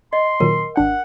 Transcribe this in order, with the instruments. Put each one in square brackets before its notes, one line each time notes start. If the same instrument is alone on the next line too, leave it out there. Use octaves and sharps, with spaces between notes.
[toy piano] D#5 [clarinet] C6
[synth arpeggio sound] A#2 D#3 F#3 [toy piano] A#4
[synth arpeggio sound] G#1 D4 G5 [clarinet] F#5